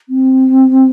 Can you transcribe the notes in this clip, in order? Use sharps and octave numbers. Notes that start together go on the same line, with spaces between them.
C4